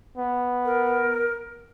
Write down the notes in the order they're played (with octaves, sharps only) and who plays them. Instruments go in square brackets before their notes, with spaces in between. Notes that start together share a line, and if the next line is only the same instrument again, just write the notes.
[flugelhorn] B3
[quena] A#4